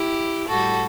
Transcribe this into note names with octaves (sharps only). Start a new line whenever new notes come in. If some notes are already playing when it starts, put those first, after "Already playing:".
Already playing: E4 G4
A2 G3 F#4 A4